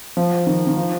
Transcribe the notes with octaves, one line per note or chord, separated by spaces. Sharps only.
F3
D#3
D#3
F3